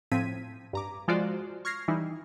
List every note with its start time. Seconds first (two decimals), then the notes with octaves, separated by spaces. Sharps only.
0.12 A2 F3 C4 G#6 B6 D#7
0.73 G2 A#5 D6
1.08 F3 G#3 F4 F#4 C5 D5
1.65 C#6 F6 G#6 A#6 C7
1.88 E3 G3 D#4 E4